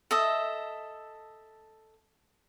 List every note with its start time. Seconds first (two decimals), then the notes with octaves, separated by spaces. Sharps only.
0.11 A4 D#5 E5